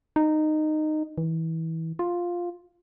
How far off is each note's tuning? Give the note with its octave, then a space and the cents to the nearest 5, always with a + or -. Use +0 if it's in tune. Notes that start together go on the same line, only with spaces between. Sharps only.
D#4 -15
E3 -25
F4 +5